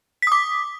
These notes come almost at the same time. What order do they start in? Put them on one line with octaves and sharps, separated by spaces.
B6 D#6 D6